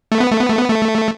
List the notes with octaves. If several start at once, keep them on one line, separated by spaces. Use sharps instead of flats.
A3
B3
A3
B3
A3
B3
A3